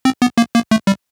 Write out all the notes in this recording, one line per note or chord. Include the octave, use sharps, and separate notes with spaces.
C4
B3
A#3
A#3
A3
G3